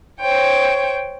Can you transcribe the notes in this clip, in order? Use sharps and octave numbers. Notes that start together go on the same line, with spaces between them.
C5 C#5 G5